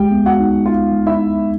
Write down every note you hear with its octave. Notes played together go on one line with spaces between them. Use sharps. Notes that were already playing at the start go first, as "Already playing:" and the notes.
Already playing: G#3 G4 G5
B3
F#4 F#5
D#4
D#4 F4 F5
G#3
E4 E5
D#4